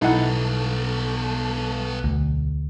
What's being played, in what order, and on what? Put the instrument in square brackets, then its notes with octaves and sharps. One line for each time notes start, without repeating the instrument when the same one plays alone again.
[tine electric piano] B1 [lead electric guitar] B3 A4 [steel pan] D#4 E4 F#5
[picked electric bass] D2